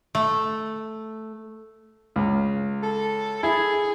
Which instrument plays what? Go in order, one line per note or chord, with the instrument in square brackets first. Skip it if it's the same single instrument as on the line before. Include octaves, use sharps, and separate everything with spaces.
[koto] A3
[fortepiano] C#2
[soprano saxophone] A4
[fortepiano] E4 [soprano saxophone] G#4